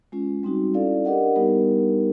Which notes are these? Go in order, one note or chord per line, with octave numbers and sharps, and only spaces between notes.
G#3 C#4 F4
G3 C4 D#4 F#4
C#4 E4 A4 D5 F5
D4 G4 A#4 D#5 F#5
G3 B3 D#4 G4 A#4